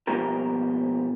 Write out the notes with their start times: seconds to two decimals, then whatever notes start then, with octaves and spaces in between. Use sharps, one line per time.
0.07 F2 B2 A#3 B3 G4 A#4